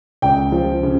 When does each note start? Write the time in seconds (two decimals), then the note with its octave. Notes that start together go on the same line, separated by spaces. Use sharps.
0.22 C#2 G5
0.52 F3
0.83 C#3